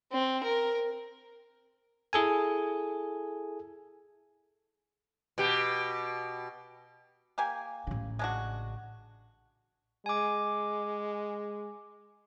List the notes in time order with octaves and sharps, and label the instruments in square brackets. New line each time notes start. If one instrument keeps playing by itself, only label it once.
[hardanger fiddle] C4
A#4
[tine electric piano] E4 G#4 A4 G#5
[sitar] B2 G4
[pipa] A#3 G4 G#5
[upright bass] A1 C#3
[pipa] G#3 D4 F#4
[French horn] G#3 [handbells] G#5 D6